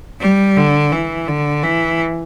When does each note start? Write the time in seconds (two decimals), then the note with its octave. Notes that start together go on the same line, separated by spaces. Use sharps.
0.21 G3
0.57 D3
0.92 E3
1.28 D3
1.63 E3